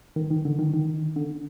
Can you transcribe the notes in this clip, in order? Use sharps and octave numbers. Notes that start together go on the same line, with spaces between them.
D#3
D#3
D3
D#3
D#3
D3